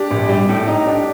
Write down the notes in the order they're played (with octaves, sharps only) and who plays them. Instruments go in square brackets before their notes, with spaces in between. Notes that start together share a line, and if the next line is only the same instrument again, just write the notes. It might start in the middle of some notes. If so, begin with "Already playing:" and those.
Already playing: [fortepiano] D4 [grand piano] G4
[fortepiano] A#1
G3
A2
D#4
D4